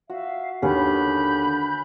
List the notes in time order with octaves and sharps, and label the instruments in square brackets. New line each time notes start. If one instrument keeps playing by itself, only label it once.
[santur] F#4 [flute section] E5 F5
[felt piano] D#2 [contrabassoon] D3 [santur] C#4 B4 F#5 [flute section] B5 F#6 G6